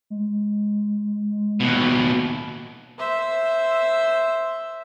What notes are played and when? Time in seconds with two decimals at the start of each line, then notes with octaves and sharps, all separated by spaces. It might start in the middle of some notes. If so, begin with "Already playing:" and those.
0.10 G#3
1.60 D#2 B2 B3
2.98 C5 E5